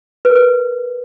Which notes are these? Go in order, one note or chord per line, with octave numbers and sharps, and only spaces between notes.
B4
A#4
B4